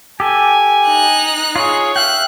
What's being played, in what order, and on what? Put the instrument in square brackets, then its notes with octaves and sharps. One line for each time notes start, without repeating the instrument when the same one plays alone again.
[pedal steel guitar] G4 A4 [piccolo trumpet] G#5
[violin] D#4 F#6
[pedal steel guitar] F4 G#4 [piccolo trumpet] C#5
[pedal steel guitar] E5 F5 G5 [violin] F#6